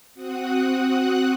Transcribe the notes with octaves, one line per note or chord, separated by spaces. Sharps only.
C4 F#4 F#5 D#6 F#6